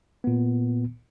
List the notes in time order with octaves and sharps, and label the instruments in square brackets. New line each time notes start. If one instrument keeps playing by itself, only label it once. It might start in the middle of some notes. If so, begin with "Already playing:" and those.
[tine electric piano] A#2 B3